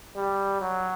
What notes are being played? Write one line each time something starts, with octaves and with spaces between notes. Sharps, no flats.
G3
F#3